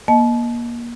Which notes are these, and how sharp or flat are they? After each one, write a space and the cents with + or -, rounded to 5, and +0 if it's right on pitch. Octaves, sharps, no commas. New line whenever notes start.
A#3 +30 D#5 +0 A5 -35